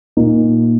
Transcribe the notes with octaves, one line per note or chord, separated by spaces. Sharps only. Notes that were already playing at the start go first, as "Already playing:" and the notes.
A#2 A#3 D#4